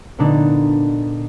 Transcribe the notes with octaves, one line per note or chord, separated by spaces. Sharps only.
A#2 D3 B3 D4 D#4